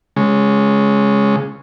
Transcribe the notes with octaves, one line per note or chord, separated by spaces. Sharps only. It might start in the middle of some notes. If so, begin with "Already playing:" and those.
C#3 G#3